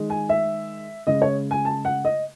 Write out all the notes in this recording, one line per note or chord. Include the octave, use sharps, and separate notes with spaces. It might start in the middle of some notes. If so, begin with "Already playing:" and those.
Already playing: D#3 G#3
G#5
E5
C#3 G#3 D#5
C#5
G#5
A5
F#5
D#5